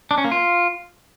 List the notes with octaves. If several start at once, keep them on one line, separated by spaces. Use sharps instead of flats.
D4
C#4
A#3
F4